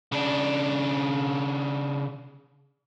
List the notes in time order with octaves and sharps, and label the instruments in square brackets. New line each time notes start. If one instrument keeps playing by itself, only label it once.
[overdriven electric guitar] C#3 D4